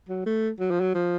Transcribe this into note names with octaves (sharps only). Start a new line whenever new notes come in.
F#3
A3
F#3
F3
F#3
F3